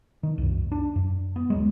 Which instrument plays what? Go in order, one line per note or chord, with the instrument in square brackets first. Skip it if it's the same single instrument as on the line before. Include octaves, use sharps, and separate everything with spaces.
[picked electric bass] D#3
C2 F#2
D4
F#2
B3
D1 F#3 G#3